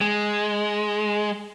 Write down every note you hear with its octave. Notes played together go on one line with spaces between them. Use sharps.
G#3